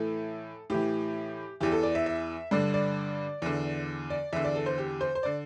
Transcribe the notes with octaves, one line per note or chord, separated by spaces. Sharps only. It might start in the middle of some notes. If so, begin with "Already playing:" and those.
Already playing: A2 E3 A4
A2 E3 G4
E2 E3 G4
A4
D5
E5
E5
G2 D3 D5
D5
E2 D3
D5
E2 D3 E5
D5
A4
C5
G4
C5
C5
D3 D5